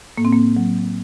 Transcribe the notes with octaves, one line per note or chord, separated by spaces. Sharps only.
A2 A#3
C4
A#3
F#3